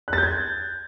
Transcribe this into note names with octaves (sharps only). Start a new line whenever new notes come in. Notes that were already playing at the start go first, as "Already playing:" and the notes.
F#6
A6
G6
G#6